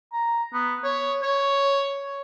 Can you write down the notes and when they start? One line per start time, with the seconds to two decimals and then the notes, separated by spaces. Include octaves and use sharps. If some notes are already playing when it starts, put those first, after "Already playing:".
0.13 A#5
0.54 B3
0.84 C#5
1.23 C#5